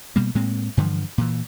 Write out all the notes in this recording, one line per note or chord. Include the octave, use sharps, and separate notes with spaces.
B2 G3 A#3
A2 G#3 A#3 C4
G2 D3 E3 F3
A#2 E3